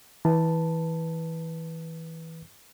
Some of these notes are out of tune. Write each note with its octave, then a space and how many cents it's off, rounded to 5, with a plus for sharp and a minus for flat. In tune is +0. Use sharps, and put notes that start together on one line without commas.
E3 -25 B4 -5 A5 +0